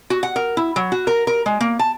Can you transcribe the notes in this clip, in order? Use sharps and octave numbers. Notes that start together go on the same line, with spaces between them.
F#4
F#5
A#4
E4
F#3
F#4
A#4
A#4
G#3
A#3
A5